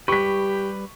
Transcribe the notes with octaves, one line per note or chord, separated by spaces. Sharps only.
G3 G4 B4 C#6 B6